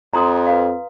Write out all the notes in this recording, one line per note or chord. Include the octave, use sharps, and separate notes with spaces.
F2 A#5 C6 D#6
B4 F5